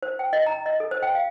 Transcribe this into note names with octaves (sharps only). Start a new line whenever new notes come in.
C5
G5
D#5
A#5
D#5
A4
C5
G5
F5